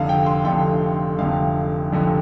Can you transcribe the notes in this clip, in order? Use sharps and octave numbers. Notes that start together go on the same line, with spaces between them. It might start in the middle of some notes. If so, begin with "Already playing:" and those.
Already playing: F1 F2 D3 F5
G5
C6
F1 F2 D3 G5
F1 F2 D3 F5
F1 F2 D3